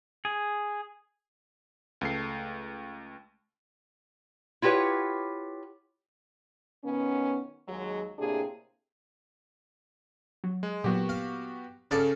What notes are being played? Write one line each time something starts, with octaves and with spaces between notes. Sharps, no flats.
G#4
C#2 A3 C7
E4 F4 G4 B4 C#5 F#5
B2 D#3 B3 C#4
D#2 F#3 G#3
A2 C3 A#3 D4 G4 G#4
F#3
G#3
A#2 F#3 A#3 B3 F#4 G4
F5
C#3 C#4 A4 D5 F5 A5